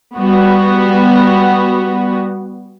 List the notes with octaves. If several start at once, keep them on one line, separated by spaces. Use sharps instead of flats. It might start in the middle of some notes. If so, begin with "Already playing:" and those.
G3 B3 F#4